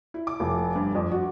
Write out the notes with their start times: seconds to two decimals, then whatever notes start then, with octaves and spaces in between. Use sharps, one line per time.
0.14 E4
0.27 D6
0.40 F1
0.75 G2
0.95 F2
1.11 F#4